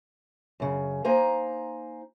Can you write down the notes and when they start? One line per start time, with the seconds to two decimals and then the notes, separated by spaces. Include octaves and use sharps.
0.60 F#2 C#3
1.04 A#3 D#4 C5 G#5 A#5